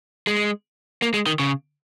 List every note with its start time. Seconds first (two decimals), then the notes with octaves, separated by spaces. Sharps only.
0.27 G#3
1.02 A#3
1.14 G#3
1.26 D#3
1.40 C#3